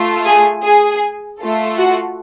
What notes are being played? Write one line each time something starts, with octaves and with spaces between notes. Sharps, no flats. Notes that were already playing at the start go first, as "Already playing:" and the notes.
Already playing: A3 F4
G#4 G#5
G#4 G#5
A3 F4 A4
F#4 F#5